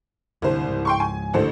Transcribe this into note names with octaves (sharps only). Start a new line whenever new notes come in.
D1 C2 D3 C5
C#2 G#2
G5 C6 C#6
G#5
A1 D3 C5